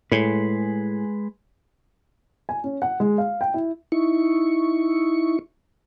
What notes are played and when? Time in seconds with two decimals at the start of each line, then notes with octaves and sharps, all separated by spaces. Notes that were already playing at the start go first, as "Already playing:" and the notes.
0.12 A2 G#3 G#4 B4
2.49 G#5
2.64 C#4
2.82 F#5
3.00 G#3
3.18 F5
3.41 G5
3.54 E4
3.92 D#4 E4 C#6